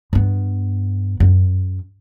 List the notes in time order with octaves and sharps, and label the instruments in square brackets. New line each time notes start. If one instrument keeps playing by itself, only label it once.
[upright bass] G2 B3
F#2